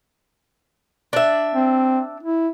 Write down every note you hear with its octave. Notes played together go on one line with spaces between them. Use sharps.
D4 E5
C4
E4